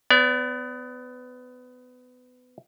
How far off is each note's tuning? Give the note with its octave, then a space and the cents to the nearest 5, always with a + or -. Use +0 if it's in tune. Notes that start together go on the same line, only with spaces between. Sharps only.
B3 +25 D5 -35